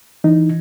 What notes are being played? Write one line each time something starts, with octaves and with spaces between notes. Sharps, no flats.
E3 D#4